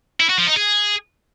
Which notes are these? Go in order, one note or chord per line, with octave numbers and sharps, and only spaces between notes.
E4
F#4
F3
D#4
G#4